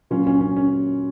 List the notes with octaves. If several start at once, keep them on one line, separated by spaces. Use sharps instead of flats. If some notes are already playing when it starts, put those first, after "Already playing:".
A#2 F#3 C#4 F4
C#4
C#4
C#4